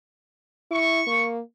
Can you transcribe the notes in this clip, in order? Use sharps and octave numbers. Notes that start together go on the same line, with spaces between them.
E4 C#6
A#3